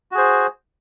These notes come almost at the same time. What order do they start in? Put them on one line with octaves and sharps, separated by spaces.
F#4 G#4 C5